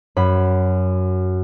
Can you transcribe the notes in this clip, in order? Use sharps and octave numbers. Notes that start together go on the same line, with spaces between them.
F#2 B5